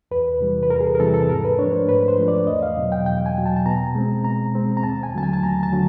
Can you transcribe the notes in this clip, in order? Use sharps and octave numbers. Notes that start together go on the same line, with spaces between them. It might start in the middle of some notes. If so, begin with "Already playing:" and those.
E2 B4
C3 E3 G3
B4
E2 A#4
G#4
A4
A#4
C3 E3 G3 A4
A4
G#2 A#4
B4
F3 A3 D4 C#5
C5
G#2 B4
C5
F3 A3 D4
D5
E2 D#5
F5
B2 F#3
G5
E2 G5
G#5
B2 F#3
A5
A5
B2 A#5
G#3 C4
B2 A#5
G#3 C4
A#5
D#2 A5
G#5
D3 F#3 A3 A5
G#5
A5
D#2 A#5
A5
D3 F#3 A3